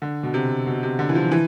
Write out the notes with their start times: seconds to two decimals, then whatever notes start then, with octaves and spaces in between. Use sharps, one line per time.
0.02 D3
0.23 B2
0.34 C3
0.67 B2
0.83 C3
0.99 D3
1.09 E3
1.15 F3
1.32 E3